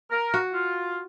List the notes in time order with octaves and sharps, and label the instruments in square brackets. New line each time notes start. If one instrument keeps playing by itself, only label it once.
[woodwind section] A#4
[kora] F#4
[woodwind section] F4